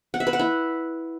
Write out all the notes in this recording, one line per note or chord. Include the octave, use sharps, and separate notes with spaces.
F#5
E5
B4
F#5
E4